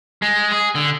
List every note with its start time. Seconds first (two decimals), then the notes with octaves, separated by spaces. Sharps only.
0.22 G#3
0.52 G#4
0.75 D3